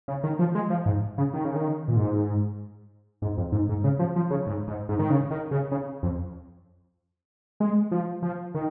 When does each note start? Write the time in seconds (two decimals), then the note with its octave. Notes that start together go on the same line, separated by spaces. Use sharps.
0.08 C#3
0.23 D#3
0.39 F3
0.55 G#3
0.70 F3
0.86 G#2
1.18 C#3
1.33 D#3
1.45 C#3
1.55 D#3
1.88 A#2
1.96 G#2
3.22 G#2
3.37 F2
3.52 G#2
3.69 G#2
3.84 C#3
3.99 F3
4.16 F3
4.30 C#3
4.46 G#2
4.68 G#2
4.89 G#2
4.99 D#3
5.10 C#3
5.31 D#3
5.51 C#3
5.72 C#3
6.03 F2
7.60 G#3
7.91 F3
8.22 F3
8.54 D#3